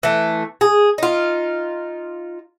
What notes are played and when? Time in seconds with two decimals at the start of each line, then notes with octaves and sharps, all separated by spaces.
0.03 E3 A3
0.61 G#4
0.98 D#4 F4